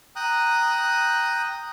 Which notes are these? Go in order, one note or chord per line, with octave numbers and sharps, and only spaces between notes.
G5 A#5 D#6 F#6